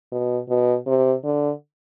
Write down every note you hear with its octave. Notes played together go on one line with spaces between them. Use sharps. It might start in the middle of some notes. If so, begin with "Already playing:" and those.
B2
B2
C3
D3